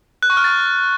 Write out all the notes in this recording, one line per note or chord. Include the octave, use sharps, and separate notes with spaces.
F#6
C#6
F6
A6